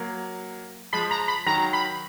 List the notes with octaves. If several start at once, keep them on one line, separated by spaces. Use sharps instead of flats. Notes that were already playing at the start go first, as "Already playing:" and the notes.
Already playing: F#3 A#3
F3 G#3 B5
A#5
B5
D#3 F#3 A#5
B5